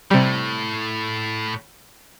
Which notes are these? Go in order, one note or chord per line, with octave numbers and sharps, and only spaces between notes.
A2 C3 G3